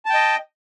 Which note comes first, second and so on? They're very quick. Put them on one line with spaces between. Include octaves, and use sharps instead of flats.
A5 G5 D#5